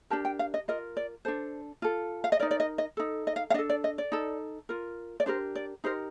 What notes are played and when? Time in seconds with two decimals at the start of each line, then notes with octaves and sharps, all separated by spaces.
0.10 D4 G4 A#4 A5
0.25 G5
0.39 F5
0.54 D#5
0.68 F4 A#4 D#5
0.97 D5
1.25 D4 A4 C5
1.82 F4 A4
2.24 F5
2.32 D#5
2.39 D#4 A#4 D5
2.51 D5
2.60 D#5
2.78 D#5
2.97 D#4 A4
3.27 D#5
3.36 F5
3.50 F5
3.54 D4 D#5
3.58 A4
3.69 D5
3.84 D#5
3.98 D5
4.12 D#4 A4
4.69 F4 A#4
5.20 D5
5.26 D4 G4 A#4 C5
5.55 D5
5.84 D#4 G4 A#4 C5